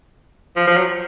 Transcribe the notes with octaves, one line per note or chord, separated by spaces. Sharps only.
F3
F3
F#3